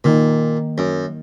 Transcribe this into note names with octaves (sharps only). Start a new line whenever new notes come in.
A#2 D#3 A#3 D#4
F#2